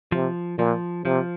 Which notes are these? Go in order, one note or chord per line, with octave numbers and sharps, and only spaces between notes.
C3 F3
A#2 F3
C3 F3